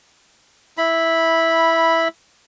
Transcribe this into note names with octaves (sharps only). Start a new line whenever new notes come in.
E4 B5